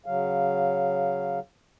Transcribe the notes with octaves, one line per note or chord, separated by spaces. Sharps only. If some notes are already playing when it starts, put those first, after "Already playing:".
C#3 F#3 F5